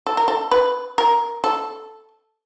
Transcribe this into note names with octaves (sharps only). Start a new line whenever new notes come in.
A4
A#4
A4
B4
A#4
A4